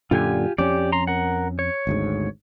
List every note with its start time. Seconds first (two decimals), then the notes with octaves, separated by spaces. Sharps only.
0.11 F#2 A#2 D3 F4 G4 G#5
0.58 F2 C#4 G4 D5
0.92 A#5 C6
1.07 A#4 F#5
1.59 C#5
1.87 G#1 D2 G#2